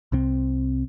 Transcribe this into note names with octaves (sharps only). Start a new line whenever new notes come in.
C2 C3 C4